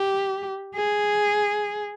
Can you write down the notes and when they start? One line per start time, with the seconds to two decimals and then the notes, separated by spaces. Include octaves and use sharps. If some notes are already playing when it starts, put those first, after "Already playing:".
Already playing: G4
0.75 G#4